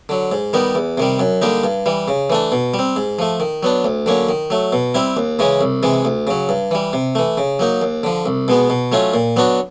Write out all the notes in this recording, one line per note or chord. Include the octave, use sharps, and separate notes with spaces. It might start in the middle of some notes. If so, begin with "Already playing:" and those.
D3 F#3
G#2
D#3 G3 B3 D#4
E2
C3 D#3 G3
F#2
D3 G3 A#3 D#4
G2
E3 G3
C#3
E3 A3 D4
B2
G3
C4
G#2
F3 A3
D#3
F#3 B3 D4
D2
D3 F#3 A#3 C#4
D#3
F#3 A3
B2
G3 C4 E4
D#2
C#3 E3 G#3 C#4
C2
C3 E3 G#3
D2
C#3 F#3
G2
E3 G3
C3
E3 A3
C#3
F#3 A#3 D#4
D#2
D3 F3
C2
B2 G#3 B3
B2
F#3 A3 C#4 F4
A#2
F#3 B3 D4 F#4